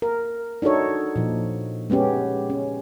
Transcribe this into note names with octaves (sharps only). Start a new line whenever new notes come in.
A#4
D4 D#4 F#4 A4 C#5
A#2 F3
G#3 B3 C#4 G4
C#4